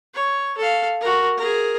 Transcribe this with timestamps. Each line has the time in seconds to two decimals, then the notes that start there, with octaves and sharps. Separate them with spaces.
0.14 C#5
0.58 A4 F5
1.00 F#4 A#4
1.37 G#4 A#4